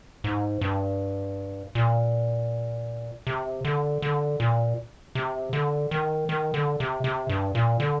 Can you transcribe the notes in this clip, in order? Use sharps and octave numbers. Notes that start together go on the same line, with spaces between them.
G#2
G2
A#2
C3
D3
D3
A#2
C3
D3
D#3
D#3
D3
C3
C3
G2
A#2
D3